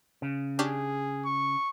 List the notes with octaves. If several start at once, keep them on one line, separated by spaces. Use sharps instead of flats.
C#3
C#4 D4 G4 G#4
C#6